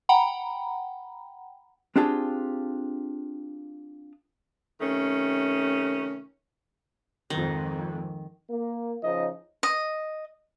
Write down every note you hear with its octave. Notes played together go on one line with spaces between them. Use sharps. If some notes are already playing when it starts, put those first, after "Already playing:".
F#5 G5 A#5 B5
C4 D4 F4 G4 G#4 A5
C3 D#3 A3 C#4
F2 G#2 D#3
A#3
C#3 F3 D#4 D#5
D#5